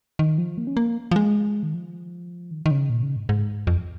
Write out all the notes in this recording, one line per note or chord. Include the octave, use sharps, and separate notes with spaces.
D#3
F3
A#3
C#4
A#3
F3
G#3
D#3
F3
D#3
D#3
C#3
A#2
C#3
G#2
G#2
F2